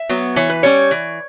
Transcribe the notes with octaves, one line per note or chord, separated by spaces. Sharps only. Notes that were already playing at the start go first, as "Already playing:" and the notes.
Already playing: E5
F#3 B3
E3 C#5
B4
G3 C#4 C#5
E3